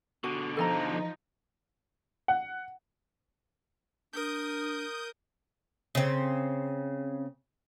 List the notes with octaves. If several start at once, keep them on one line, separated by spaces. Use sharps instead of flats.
B2 D3 F#4
F3 D#4 A4 D#5 A#5
F#5
D4 A#4 D#6 G6
C#3 C4